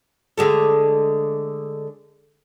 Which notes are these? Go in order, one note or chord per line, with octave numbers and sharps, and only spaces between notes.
D3 G#3 A3